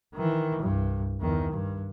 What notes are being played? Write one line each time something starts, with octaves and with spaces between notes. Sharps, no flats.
D#3 E3
C2 G2
E2 D#3
G2